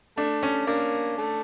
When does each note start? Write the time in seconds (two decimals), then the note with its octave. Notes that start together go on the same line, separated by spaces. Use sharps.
0.17 A3 D4
0.43 C#4
0.67 A#3 D4
1.18 A3